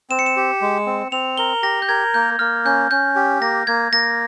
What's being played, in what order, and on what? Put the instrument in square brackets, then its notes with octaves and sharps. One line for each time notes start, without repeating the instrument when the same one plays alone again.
[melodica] C4 [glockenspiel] E7
[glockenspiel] C#7
E7
[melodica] G4
G#3
C4
[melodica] C4 [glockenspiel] F7
[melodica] A#4 [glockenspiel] G7
[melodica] G4 [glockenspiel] A#6
[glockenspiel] G6
[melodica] A#4 [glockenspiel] G#6
[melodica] A#3 [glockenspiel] G6
[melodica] A#3 [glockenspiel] F6
[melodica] C#4 [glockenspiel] G6
[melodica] C#4 [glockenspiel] G6
[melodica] G4
[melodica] A#3 [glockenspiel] A#6
[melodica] A#3 [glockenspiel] G#6
[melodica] A#3 [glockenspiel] A#6